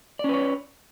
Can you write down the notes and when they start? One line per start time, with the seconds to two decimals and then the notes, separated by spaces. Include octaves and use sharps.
0.19 D5
0.24 C#4
0.29 B4
0.34 C#5